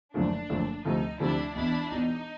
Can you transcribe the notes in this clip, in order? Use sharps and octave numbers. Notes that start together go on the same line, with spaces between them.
F#1 F#2 D3 F3 A3 D4
F#1 F#2 D3 F3 A3
D2 C3 F3 A3 D#4
D2 C3 F3 A3 D4 E4
E1 E2 B2 D4 E4
E1 E2 B2 D#4